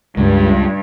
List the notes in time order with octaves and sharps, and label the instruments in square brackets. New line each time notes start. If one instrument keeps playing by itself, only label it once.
[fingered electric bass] C#2 G#3 [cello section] G2